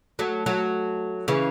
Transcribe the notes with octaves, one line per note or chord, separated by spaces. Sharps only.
F#3 A3
F#3 A3
C#3 E3